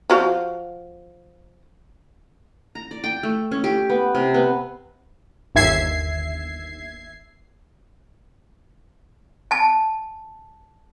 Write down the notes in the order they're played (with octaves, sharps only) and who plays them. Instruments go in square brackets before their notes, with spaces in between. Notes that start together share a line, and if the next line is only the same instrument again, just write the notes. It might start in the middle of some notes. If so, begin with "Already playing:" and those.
[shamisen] F3 F#4 F5
[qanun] A#5
D5
G5
A3
C#4
G4
B3
C3
B3
[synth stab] G1 D#2 E5 G#6 C7
[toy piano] G#5 A5